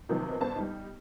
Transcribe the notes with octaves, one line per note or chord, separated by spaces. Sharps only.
C3 D#3 F3 F#3 B3
G1 B3 C5 A5
G3 D#4